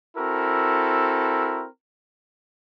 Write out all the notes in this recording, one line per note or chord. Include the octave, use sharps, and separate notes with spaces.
C4 E4 F#4 A4 A#4